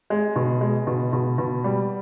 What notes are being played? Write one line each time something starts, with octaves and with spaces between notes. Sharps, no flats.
G#3
B2
G#3
B2
B2
B2
G3